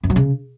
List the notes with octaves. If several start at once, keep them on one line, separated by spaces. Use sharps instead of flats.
F#2
F#3
C#3